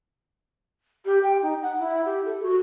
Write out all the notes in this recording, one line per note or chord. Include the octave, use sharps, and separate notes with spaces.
G4
G5
D#4
F#5
E4
G4
A4
F#4